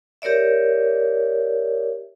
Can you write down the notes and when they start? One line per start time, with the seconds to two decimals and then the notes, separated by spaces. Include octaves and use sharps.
0.22 G4 A#4 C#5 D5 E5